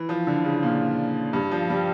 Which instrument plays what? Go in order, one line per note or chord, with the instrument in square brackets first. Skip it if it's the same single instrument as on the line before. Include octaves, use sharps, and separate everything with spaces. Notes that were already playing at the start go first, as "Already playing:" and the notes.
Already playing: [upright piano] E3
F3
D3
C#3
A#2
G2
F3
G3